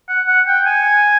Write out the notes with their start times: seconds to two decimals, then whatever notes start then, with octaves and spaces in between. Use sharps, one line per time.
0.09 F#5
0.28 F#5
0.47 G5
0.66 G#5